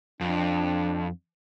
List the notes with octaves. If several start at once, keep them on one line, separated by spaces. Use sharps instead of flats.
F2 D4